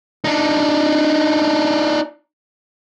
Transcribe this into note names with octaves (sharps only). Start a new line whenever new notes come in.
D4 D#4